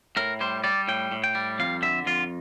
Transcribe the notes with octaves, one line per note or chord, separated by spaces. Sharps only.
A2 A#4
G3 C5
G3 D5
A2 G5
A2
G5
G3
F2 F5
D3 E5
F2 F4